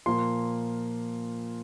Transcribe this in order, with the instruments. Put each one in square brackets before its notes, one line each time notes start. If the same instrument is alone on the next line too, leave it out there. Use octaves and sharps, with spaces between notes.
[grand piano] A#2 F3 A#3 C6